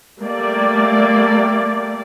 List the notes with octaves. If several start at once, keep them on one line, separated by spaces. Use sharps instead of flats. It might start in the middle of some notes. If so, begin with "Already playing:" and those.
G3 A3 A#3 D5